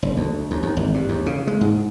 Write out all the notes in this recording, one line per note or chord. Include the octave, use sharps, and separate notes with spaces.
F#1
D2
D#2
D#2
G#1
G2
D#2
C#3
G#3
G#2